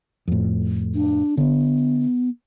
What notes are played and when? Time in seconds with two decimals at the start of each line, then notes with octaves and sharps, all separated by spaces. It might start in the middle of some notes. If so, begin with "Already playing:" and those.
0.28 F2 A2
0.94 D4
1.37 D3 B3